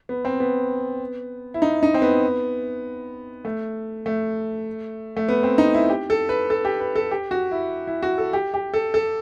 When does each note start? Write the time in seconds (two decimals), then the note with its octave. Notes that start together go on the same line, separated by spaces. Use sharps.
0.09 B3
0.25 C4
0.40 B3
1.54 E4
1.62 D#4
1.83 D#4
1.94 C4
2.02 B3
3.45 A3
4.06 A3
5.17 A3
5.29 B3
5.43 C4
5.58 D#4
5.74 E4
5.89 G4
6.10 A4
6.29 B4
6.50 A4
6.65 G4
6.80 B4
6.95 A4
7.11 G4
7.31 F#4
7.51 E4
7.87 E4
8.02 F#4
8.18 A4
8.33 G4
8.54 G4
8.74 A4
8.94 A4